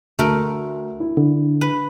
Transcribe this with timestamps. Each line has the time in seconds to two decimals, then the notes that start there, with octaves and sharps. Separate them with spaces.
0.19 D2 A3 A#4
1.00 E4
1.17 D3
1.61 B4